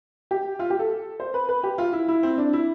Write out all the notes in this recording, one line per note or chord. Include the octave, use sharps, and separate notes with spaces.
G4
F4
G4
A4
C5
B4
B4
G4
F4
E4
E4
C4
D4
E4